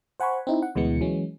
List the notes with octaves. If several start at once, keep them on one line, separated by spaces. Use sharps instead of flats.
C5 F#5 G#5 B5 C#6
C4 D#4 E4
F#5
D2 B2 E3 G#3 B3 C#7
E3 F#3 G#3 C#4